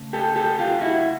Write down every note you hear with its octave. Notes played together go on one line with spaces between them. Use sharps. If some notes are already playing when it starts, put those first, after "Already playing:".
Already playing: C#3 A3
G4 A4
G4 A4
F4 G4
E4 F#4